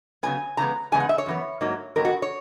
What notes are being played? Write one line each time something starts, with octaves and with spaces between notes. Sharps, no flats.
C#3 F#3 B3 G#5
C#3 E3 G#3 B3 A#5
E2 C#3 G#3 B3 G#5
F#5
E5
C#5
F#2 E3 B3
G#2 F#3 A#3
G#2 D#3 F#3 B3 A#4
F#4
C#5